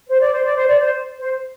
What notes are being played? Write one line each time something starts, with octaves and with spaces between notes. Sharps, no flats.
C5
D5
C5
D5
C5
D5
C5
C5